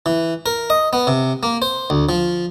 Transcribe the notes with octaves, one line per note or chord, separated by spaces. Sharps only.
E3
A#4
D#5
B3
C3
A#3
C5
D2
F3